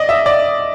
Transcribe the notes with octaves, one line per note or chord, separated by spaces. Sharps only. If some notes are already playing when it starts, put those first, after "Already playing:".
Already playing: D5 D#5
E5
D5